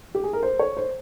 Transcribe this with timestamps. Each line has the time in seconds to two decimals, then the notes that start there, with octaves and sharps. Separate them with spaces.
0.15 G4
0.24 G#4
0.33 A#4
0.43 C5
0.59 C#5
0.77 C5